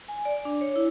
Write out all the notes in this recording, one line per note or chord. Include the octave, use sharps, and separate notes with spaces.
G#5
D5
D4
C#5
E4